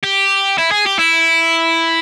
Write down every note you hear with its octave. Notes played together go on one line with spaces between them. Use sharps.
G4
E4
G#4
G4
E4